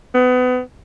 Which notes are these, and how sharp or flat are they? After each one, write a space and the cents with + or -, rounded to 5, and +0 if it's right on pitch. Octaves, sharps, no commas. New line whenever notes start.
B3 +30